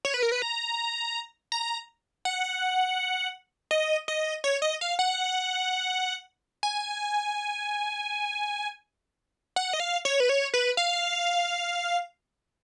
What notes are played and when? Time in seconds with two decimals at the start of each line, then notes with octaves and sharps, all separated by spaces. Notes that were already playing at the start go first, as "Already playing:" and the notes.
0.05 C#5
0.14 B4
0.23 A#4
0.32 B4
0.42 A#5
1.52 A#5
2.25 F#5
3.71 D#5
4.08 D#5
4.44 C#5
4.62 D#5
4.81 F5
4.99 F#5
6.63 G#5
9.56 F#5
9.73 D#5
9.80 F5
10.05 C#5
10.20 B4
10.29 C#5
10.54 B4
10.77 F5